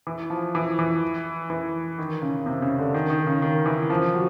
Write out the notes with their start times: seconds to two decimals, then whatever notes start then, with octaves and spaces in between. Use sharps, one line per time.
0.07 E3
0.30 F3
0.55 E3
0.79 E3
1.50 E3
1.98 D#3
2.22 C#3
2.39 C#3
2.46 C3
2.62 C#3
2.78 D3
2.94 D#3
3.10 D#3
3.27 C#3
3.42 D#3
3.66 E3
3.90 F3
4.14 F#3